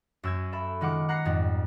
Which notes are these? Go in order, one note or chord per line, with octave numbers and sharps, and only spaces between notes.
F#2 E6 G#6
A4 E5 B5
D#3 G#3 F4 F#5 D6
F#5 A#5 F#6 C7 C#7
F2 G#2 G3